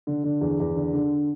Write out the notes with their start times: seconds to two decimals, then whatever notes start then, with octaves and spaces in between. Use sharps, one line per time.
0.07 D3
0.24 D3
0.41 E2
0.60 E2
0.76 D3
0.93 D3